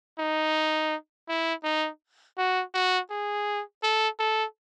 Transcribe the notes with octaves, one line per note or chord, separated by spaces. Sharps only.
D#4
E4
D#4
F#4
F#4
G#4
A4
A4